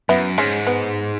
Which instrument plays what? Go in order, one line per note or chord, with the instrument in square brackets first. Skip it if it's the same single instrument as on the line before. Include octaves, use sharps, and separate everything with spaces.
[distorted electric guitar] F#2 [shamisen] B3 E4
[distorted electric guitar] G#2 [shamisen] G#3 C#4
[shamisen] B3